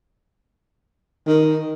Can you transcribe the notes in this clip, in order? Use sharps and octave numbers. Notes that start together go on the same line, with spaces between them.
D#3